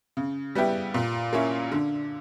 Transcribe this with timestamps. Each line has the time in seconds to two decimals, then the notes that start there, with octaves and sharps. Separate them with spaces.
0.17 C#3
0.55 G3 B3 E4 G4
0.94 A#2
1.33 A#3 C#4 E4
1.72 D3